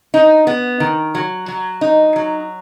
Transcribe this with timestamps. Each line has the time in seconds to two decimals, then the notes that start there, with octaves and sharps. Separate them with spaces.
0.14 D#4
0.47 B3
0.80 D#3
1.15 F#3
1.48 F#3
1.81 D#4
2.16 F#3